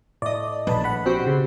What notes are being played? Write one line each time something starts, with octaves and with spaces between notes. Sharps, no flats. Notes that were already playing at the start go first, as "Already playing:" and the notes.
A2 D5 D#5
A#1 B4 A5 B5
F#5 B5
C4 F#4 G4
C#3